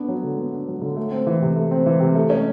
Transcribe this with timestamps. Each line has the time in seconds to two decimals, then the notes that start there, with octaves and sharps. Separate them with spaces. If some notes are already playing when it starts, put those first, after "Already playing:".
Already playing: B3 D4
0.08 F#3
0.23 D3
0.37 B3
0.52 D4
0.68 F#3
0.82 D3
0.96 A3
1.12 C4
1.27 E3
1.42 C3
1.56 A3
1.71 C4
1.86 E3
2.00 C3
2.15 A3
2.30 C#4